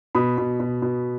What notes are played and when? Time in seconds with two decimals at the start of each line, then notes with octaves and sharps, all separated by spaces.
0.15 B2 B5 D#6
0.38 B2
0.60 B2
0.82 B2